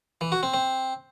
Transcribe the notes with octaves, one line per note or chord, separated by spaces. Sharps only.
E3
F#4
C4
C4